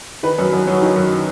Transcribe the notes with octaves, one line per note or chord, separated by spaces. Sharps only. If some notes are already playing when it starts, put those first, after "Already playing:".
D#3 B4
F#2
F#2
F#3
D#3
F#2